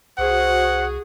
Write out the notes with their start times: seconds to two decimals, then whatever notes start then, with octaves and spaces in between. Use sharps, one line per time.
0.18 C2 F#4 G#4 C5 F#5